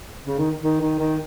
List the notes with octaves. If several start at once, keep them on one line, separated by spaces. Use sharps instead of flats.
C#3
D#3
D#3
D#3
D#3